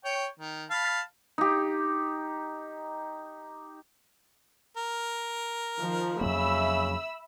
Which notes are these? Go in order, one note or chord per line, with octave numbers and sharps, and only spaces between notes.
C#5 G5
D#3
F5 A5 B5
D#4 G4
A#4
D#3 F3
F2 C#3 F#3 A#3 E5 B5 E6